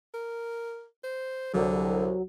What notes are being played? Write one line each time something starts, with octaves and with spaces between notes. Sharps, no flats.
A#4
C5
C2 D3 F#3